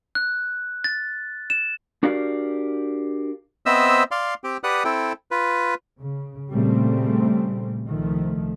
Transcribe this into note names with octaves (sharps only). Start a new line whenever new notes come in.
F#6
A6
E7
D4 F#4 G4 A#4 D5 F5
B3 C4 C5 D#5 E5 E6
D5 F5 C6
C4 G4 G5
G4 B4 D5 F#5 D#6 F#6
C4 E4 A4 G5
F4 B4
C#3
A#2 C#3 G3 A3 C4
C2 D#3 F3 A3